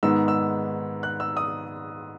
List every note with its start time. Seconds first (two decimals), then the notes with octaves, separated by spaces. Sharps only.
0.03 G#2 D#3 G#3 B3 E6
0.28 E6
1.03 F#6
1.20 E6
1.37 D#6